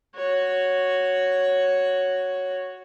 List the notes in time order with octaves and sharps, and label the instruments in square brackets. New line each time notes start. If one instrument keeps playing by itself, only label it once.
[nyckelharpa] F#4 C#5